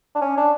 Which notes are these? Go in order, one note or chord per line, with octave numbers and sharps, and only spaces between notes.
D4
C#4
D4